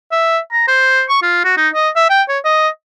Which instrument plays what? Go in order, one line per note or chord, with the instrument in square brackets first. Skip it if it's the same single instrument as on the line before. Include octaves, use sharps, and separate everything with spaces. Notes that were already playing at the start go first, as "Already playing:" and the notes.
[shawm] E5
A#5
C5
C#6
F4
F#4
D#4
D#5
E5
G5
C#5
D#5